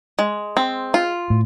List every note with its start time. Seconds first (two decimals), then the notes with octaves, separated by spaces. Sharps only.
0.19 G#3
0.57 C4
0.94 F4
1.30 A2